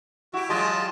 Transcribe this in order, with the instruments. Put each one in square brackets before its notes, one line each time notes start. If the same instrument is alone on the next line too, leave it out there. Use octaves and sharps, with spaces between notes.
[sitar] E4 G4 [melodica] F#4
[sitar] F#3 G#3 G4 [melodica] F4 D#5 A5